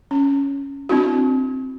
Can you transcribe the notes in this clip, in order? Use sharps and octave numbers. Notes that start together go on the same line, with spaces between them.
C#4
C4 D4 E4 F#4